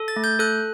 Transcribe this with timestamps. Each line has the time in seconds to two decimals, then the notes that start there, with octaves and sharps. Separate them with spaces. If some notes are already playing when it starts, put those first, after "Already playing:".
Already playing: A4
0.08 A6
0.16 A3
0.24 G6
0.39 A4 F#6